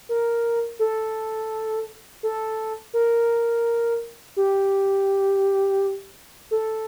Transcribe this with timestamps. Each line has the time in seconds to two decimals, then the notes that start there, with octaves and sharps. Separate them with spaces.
0.09 A#4
0.79 A4
2.23 A4
2.94 A#4
4.36 G4
6.51 A4